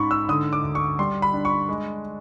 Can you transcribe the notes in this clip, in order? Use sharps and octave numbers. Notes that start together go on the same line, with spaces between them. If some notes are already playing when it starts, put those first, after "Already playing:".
Already playing: G#2 C#4 B5 C#6
E6
D3 D#6
D6
D2
C#6
G3 C6
B5
D4
C#6
G#3